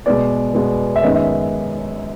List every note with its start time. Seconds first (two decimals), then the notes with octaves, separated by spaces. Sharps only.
0.06 B2 G#3 B3 D5
0.54 B2 G#3 B3
0.96 E5
1.03 F#2 D#3 G#3 B3 D#5
1.14 E5